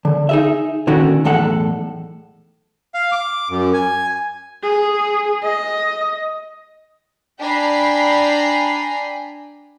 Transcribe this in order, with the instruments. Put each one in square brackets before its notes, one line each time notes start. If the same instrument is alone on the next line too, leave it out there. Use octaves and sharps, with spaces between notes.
[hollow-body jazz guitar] D3
D#4 G#4 E5
A#2 D3 D#3 C#4 F#4
B1 E2 A2 A4 F#5
[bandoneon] F5
D6
F#2
G#5
[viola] G#4
D#5
[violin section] D4 G5 G#5 A#5 B5 C7